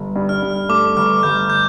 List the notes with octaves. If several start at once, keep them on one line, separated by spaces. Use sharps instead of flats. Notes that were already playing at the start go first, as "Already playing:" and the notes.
Already playing: G1
G2
F6
G2
A3 D6
G1 F6
G1 G6
G6